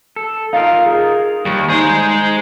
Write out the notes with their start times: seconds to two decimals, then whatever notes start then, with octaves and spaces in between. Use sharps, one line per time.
0.16 A4
0.53 D#4 F4 A#4 F5
0.85 G#4
1.45 D#2 G3
1.69 G#3 D#4 G#4 C5